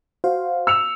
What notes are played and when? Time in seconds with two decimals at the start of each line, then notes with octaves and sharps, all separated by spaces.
0.24 F#4 C5 F5
0.67 E6 C#7 F7